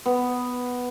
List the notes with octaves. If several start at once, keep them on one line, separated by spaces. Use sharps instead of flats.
B3